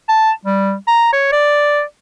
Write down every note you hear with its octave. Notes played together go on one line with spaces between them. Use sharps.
A5
G3
A#5
C#5
D5